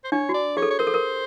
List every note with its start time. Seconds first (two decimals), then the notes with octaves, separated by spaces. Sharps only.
0.04 C5
0.12 D4 C#5
0.29 F#4
0.34 D5
0.57 G#4 C#5
0.62 A4
0.71 C#5
0.79 A#4 C5
0.87 A4
0.94 A#4